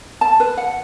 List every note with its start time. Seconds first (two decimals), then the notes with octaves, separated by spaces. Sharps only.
0.21 A5
0.40 B4
0.57 F#5